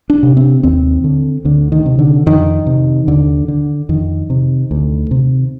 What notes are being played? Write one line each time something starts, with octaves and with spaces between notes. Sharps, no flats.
D4
C3
C4
D#2 C4
D3
D2 D3
D#3
C3
D3
F2 D#3
C3
D#2 D3
D3
F2 D#3
C3
D2
C3